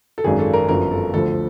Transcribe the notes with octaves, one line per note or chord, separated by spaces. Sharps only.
A4
G#1 F#2 D#3 G#4
A4
A#4
G1 F#2 D3 F3 A#4
A4
D2 D3 F3 A4